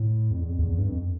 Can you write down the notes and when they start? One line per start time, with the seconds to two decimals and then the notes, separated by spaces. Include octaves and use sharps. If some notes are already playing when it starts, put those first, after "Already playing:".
Already playing: A2
0.31 F2
0.40 E2
0.50 F2
0.59 E2
0.69 E2
0.78 G2
0.88 F2